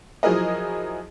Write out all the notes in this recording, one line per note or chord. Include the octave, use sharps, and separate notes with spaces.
F3 F#3 E4 G#4 A#4 D#5